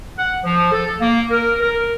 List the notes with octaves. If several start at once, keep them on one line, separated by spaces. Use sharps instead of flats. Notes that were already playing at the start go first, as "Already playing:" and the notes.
F#5
F3
A4
A#3
A#4
A#4